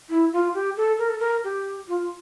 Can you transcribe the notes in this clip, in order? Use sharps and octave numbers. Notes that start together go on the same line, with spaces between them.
E4
F4
G4
A4
A#4
A4
A#4
G4
F4